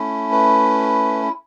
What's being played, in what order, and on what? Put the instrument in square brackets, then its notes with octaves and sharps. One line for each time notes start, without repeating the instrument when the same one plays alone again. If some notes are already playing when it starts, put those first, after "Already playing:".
Already playing: [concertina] A3 C#4 E4
B4